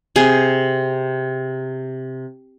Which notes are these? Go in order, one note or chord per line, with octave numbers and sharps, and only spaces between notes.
C3 G#4